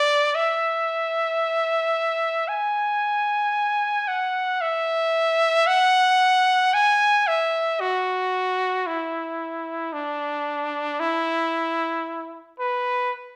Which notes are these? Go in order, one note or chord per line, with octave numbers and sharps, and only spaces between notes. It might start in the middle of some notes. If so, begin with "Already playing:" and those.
Already playing: D5
E5
G#5
F#5
E5
F#5
G#5
E5
F#4
E4
D4
E4
B4